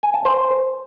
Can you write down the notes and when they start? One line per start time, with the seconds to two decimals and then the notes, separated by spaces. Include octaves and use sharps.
0.03 G#5
0.14 A5
0.25 C5